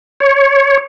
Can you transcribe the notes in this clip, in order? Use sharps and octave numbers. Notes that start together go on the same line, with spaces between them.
C#5